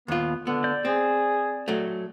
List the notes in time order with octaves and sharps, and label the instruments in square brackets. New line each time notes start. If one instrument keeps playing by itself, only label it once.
[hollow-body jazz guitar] D#2 F4 [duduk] B3
[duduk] D3 [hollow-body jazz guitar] B3
[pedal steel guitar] D5 G6
[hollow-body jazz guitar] C4 [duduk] G#4
[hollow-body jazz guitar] F#3 A3